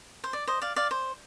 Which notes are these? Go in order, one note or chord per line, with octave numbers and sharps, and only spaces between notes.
C5
D5
C5 D#5
D5 F5
D5 F5
C5